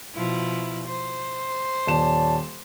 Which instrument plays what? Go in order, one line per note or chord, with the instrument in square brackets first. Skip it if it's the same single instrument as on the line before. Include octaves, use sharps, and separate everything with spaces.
[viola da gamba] B2 F3 E4
C5
[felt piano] D#1 E7 [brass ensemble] C#5 D5 A5